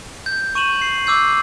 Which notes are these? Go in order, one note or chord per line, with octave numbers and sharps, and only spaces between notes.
G6
C#6 D#7 E7 F#7
C7
D6 E6 G6 C7